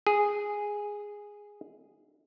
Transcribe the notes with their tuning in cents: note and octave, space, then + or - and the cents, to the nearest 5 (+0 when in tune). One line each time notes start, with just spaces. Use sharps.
G#4 -5